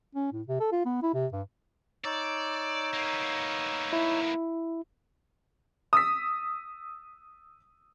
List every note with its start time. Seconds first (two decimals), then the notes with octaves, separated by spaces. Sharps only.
0.15 C#4
0.32 A2
0.48 C3
0.60 A4
0.72 F4
0.85 B3
1.02 E4
1.14 C3
1.33 G2
2.05 D#4 C#5 D5 E6
2.94 A#3 B3
3.93 E4
5.93 D#6 E6 B6